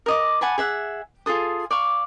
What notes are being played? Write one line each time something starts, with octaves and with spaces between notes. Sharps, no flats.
A#4 D#5 D6
F#5 G#5 A5 B5
G#4 E5 F#5
F4 G#4 A4 D#6
D5 F5 C#6